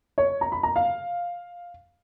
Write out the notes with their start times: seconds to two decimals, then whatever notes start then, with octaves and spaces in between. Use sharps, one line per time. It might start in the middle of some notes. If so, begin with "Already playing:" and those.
0.18 C#5
0.41 A#5
0.52 B5
0.63 A#5
0.76 F5